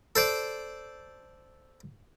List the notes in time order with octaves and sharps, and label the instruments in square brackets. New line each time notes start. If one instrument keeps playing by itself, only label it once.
[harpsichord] A4 C5 D5